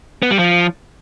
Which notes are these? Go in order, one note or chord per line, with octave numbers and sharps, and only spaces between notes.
B3
G3
F3